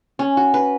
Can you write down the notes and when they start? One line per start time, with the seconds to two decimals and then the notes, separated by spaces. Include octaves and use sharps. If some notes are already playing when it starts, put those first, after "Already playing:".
0.19 C#4
0.37 F#4
0.54 B4